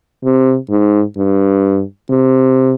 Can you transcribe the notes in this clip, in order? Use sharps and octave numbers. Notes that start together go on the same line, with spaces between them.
C3
G#2
G2
C3